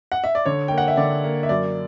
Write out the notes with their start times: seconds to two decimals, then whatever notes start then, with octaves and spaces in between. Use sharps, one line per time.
0.12 F#5
0.24 E5
0.35 D5
0.46 D3 C#5
0.68 A#3 G5
0.78 F#5
0.88 E5
0.97 D3 D5
1.24 A#3
1.43 E5
1.49 F#2 D5